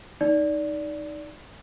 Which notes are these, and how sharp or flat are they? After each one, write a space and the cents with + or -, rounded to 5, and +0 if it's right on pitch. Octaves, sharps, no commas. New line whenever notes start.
D#4 +0 D5 -15